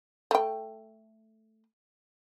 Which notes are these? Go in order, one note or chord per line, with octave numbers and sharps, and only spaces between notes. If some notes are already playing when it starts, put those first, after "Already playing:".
A3 G5